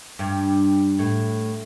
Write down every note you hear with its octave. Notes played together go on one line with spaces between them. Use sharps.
G2
A2